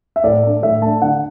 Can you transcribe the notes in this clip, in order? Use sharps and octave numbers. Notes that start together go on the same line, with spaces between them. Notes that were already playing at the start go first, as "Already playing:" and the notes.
E5
A2 D5
A3 D4
A2 E5
A3 D4 A5
D3 F#5